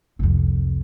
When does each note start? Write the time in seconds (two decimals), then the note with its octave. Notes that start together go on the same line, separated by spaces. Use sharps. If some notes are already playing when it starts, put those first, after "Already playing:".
0.19 C2 F2